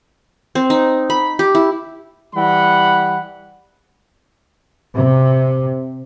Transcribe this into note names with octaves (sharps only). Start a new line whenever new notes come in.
C4
D#4
B5
G4
E4
E3 G3 F#5 B5
C3